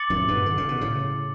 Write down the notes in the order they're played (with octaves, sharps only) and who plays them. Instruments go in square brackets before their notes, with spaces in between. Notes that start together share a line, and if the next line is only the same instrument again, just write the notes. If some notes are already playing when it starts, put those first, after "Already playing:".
Already playing: [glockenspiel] D6 A6 C#7 F#7
[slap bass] F#2 A2
G2 B2
D3
C#3
B2
A2 C#3